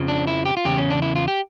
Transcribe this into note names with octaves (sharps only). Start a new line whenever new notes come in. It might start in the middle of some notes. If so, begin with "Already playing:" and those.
Already playing: F2 C#3 F3
D4
E4
G4
F4
E2 C#3 G4
C#4
D4
E4
F4
G4